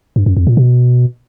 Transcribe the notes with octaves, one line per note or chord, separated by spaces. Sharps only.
G2
F#2
F2
A#2
B2